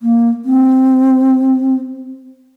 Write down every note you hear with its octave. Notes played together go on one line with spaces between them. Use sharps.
A#3
C4